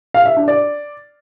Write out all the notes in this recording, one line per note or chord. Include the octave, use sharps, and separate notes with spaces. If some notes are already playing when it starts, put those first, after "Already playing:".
F5
E5
D4
D5